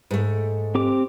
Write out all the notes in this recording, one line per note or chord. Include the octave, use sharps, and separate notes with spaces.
G#2 A3
C4 G4 D6